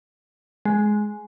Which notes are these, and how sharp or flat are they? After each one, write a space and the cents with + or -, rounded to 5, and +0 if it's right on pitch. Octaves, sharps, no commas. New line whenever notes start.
G#3 +10